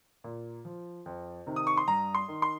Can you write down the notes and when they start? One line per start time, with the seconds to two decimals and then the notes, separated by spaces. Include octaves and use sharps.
0.24 A#2
0.65 F3
1.06 F2
1.47 C3 D#3
1.56 D#6
1.67 C#6
1.77 C6
1.88 G2 A#5
2.15 C6
2.28 D#3
2.42 C6